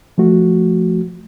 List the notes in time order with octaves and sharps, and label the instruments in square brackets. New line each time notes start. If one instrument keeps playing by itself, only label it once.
[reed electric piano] F3 A3 F#4